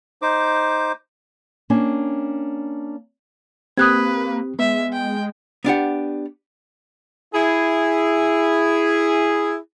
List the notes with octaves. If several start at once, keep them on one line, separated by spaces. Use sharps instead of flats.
D#4 C5 D6
A#3 C#4 D4 G5 G#5
A#3 C4 G4 B4 D#6 F#6 G#6
G#3 B3 E5
G5
B3 D4 G4 F#5
E4 G#4